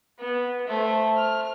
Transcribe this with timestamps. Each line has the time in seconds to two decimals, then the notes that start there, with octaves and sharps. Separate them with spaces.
0.19 B3
0.67 A3 C5
1.17 F6